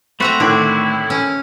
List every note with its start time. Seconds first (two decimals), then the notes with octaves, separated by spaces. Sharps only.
0.20 A3 C4 F#4 E5 A#5 B5 F#6
0.40 A2 D3 D#3 D4 E4
1.10 C#4